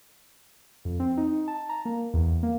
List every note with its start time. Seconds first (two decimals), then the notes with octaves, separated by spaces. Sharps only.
0.85 F2
1.00 C4
1.17 D#4
1.48 A5
1.69 A#5
1.85 A#3
2.14 E2
2.43 A#3